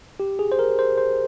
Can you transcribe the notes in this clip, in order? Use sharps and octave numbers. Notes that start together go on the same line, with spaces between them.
G4
G#4
C5
A#4
C5
C5